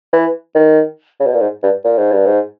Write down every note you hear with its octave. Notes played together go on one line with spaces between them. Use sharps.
E3
D#3
C#3
B2
A#2
G#2
G2
A#2
G#2
G2
G#2